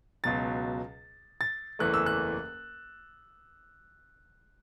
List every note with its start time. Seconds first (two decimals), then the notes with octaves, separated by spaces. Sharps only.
0.24 C#2 B2 F#3 A6
1.41 A6
1.79 F#1 E2 E3 A3 F#6
1.94 E6
2.06 F#6